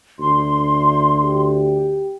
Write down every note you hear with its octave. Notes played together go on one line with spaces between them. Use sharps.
D2 C6
G4